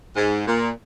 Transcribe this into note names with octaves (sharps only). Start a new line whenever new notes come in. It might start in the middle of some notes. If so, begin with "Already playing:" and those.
G#2
A#2